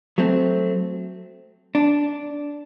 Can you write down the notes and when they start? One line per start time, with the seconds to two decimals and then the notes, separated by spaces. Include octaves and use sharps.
0.18 F#3 A3 C4
1.75 D4